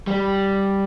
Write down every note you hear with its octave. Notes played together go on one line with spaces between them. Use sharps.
G3